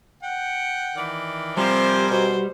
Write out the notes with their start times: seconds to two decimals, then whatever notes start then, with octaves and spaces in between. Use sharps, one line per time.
0.23 F#5 G5
0.95 D#3 E3 D5
1.57 C3 F3 G3 C4 F4 A#4 C5 G#5
2.10 B2 C5